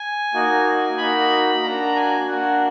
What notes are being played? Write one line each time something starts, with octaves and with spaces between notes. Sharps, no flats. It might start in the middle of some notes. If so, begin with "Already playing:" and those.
Already playing: G#5
A#3 D#4 F#4
A#3 D#4 F#4 B5
A#3 D4 F#4 A#5
G#5
A#3 D4 F#4 F#5